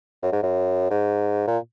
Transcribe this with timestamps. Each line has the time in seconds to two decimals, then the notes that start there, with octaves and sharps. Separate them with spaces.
0.22 F#2
0.32 G#2
0.43 F#2
0.90 G#2
1.47 A#2